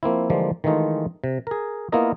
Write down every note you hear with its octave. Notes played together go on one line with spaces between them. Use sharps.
F3 A#3 C4 E4
D3 E3 F3 G3 G#3 A#3
D#3 E3 G#3 A3 D#4 F4
C3
G#4 A#4
A#3 B3 E4 F4 A#4 D#5